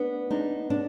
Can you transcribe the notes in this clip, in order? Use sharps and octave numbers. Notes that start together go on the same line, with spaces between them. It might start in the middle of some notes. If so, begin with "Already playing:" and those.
Already playing: B3 D4
D4 D#4
D4